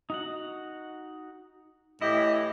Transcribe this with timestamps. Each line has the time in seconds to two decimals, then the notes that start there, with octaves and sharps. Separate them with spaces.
0.10 D#4 F#4 F#5
2.01 A2 E3 E4 G4 D#5